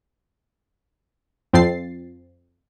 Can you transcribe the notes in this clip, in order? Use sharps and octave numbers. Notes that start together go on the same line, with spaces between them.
F2 F3 C4 A6 C7